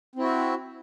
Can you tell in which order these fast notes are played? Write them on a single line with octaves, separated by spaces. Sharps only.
C4 E4 F#4